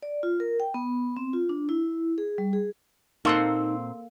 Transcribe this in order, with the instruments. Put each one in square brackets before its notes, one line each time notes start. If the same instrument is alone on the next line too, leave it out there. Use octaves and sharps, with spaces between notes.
[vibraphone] D5
F4
A#4
G5
B3
C4
F4
D4
E4
G#4
G3
G#4
[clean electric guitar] A#2 C4 C6 [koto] A#3 A4 F#5 [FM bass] D#4